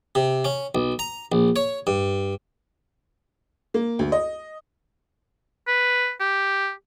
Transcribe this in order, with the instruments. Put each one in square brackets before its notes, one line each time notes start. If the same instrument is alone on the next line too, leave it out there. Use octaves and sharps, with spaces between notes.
[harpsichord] C3
C#4
B1
A#5
A#1
C#5
G2
[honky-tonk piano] A#3
D2
D#5
[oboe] B4
G4